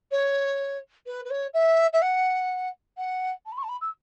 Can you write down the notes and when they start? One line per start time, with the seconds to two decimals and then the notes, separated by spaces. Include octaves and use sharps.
0.11 C#5
1.06 B4
1.25 B4
1.30 C#5
1.53 E5
1.93 E5
2.02 F#5
2.97 F#5
3.45 A5
3.52 B5
3.57 C#6
3.63 A5
3.68 B5
3.81 E6